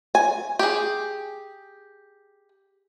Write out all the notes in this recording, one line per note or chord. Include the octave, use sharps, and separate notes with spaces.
G#5
G4 G#4